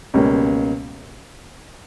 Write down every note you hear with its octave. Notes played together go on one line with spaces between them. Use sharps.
C#2 B2 G3 A#3 C#4